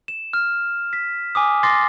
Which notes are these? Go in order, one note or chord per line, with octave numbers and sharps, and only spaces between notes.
E7
F6
B6
G#5 D6 D#6
C6 D6 A6 A#6 C7